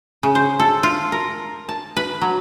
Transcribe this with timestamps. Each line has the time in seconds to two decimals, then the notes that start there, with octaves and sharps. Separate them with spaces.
0.23 C#3
0.35 C5
0.59 A4
0.83 F4
1.12 A#4
1.69 A5
1.97 B4
2.21 F#3